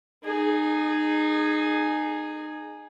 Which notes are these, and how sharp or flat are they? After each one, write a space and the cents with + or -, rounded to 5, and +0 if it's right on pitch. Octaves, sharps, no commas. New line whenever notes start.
D#4 -25 G#4 +0